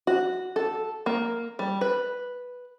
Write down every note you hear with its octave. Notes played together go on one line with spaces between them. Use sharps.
F#4
A4
A#3
G3
B4